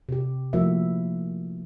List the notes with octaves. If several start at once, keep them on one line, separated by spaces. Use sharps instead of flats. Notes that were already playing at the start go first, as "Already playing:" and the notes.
C3 G4
F3 A3 A#3 E4 F#4 E5